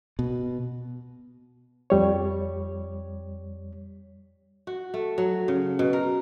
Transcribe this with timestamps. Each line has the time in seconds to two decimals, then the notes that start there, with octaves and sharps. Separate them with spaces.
0.19 B2
1.90 F2 G3 C#5
4.67 F#4
4.94 A3
5.18 F#3
5.48 C#3
5.79 B2
5.93 A#4